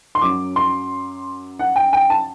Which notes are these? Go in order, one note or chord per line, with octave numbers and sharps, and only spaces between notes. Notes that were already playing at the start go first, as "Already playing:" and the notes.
C6
F#2 F#3 D6
C6
F#5
G5
G5
A5